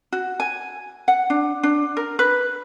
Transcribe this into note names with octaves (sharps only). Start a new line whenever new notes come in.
F#4
G#5
F#5
D4
D4
A#4
B4